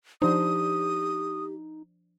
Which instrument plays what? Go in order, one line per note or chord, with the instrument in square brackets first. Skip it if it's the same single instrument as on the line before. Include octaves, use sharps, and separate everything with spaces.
[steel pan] F3 D4 C5 [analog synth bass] D#4 [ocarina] G4 [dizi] D#6